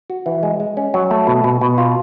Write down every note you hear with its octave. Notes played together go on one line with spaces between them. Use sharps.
F#4
E3
G#3
G#3
C#4
F#3
A3
B2
B2
B2
F4